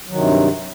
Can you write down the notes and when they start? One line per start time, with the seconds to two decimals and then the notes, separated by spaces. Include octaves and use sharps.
0.07 F#3
0.10 D#3
0.14 C3
0.17 G2